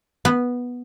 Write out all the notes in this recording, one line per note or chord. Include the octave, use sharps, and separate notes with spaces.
B3